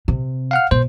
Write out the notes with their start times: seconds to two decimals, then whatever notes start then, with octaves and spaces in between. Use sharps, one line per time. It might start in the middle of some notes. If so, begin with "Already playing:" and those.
0.08 C3
0.51 F5 F#5 F6
0.71 B2 C5